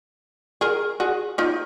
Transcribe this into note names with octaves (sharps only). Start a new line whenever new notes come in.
G#4 A#4
F#4 G#4
D#4 F4